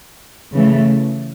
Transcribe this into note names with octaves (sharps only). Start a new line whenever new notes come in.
C#3 E3 A3